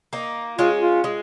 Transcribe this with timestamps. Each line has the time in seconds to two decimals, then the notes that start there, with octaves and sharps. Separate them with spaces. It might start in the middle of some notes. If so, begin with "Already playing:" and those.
0.13 A#3 D#4
0.58 G#3 C#4 F4
0.81 F4
1.04 G#3